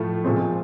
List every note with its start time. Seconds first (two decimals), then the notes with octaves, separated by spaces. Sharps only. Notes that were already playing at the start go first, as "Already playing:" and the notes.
Already playing: A2 F3 A3
0.24 A#2 F3 G#3 C4